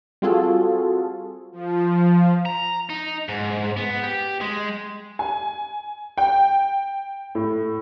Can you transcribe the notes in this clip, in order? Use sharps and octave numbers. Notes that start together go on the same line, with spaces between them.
G3 C4 F4 F#4 G#4 A4
F3
A#5
D#4
G#2
B3
G4
G#3
G#5
G5
A2